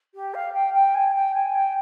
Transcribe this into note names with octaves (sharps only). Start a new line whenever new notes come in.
G4
F5
G5
G5
G#5
G#5
G5
G#5
G5